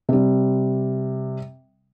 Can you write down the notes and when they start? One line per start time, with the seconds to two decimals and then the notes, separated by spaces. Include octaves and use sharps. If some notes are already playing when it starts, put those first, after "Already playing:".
0.09 C3 G3